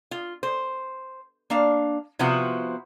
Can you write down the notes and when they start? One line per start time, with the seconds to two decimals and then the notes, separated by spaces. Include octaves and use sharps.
0.11 F4
0.43 C5
1.50 A#3 D4 F5
2.19 C3 F3 B3 E4 F#4